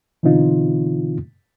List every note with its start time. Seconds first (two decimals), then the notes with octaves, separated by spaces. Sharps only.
0.23 B2 D3 E3 C4 D#4 F4